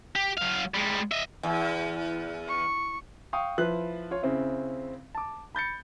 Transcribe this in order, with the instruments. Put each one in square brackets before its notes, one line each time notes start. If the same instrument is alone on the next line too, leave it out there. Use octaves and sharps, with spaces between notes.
[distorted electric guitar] G4
F#3 F5
G3 G#3
D#5 E5
[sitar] E2
[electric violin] C#6
[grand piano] F5 G5 C#6 D#6
F3 E4 B4 F#6
F4 C#5 F5
C#3 C4 E4
A5 D6
B5 G6 A6 C#7